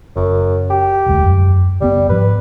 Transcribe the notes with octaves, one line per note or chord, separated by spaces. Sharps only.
F#1 F#2
G4
E1 D2 G#3
F#2
F#1 B2 G3 B3
G#2 F3 B4